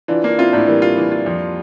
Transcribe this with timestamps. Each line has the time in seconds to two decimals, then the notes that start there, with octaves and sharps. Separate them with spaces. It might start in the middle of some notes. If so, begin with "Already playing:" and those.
0.08 E3 D4 F4
0.23 A#3 D4 F4
0.38 C4 E4 F4
0.53 A2 A#3 D4
0.67 E3 G3 A#3
0.82 F4
0.97 E3
1.12 F4
1.26 F2